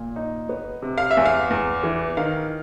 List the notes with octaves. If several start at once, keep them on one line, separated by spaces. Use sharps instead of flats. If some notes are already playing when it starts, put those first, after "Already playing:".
Already playing: A#2
D#4
B3
C3
F5
E5
E2
F5
E2
E3
D#3 F5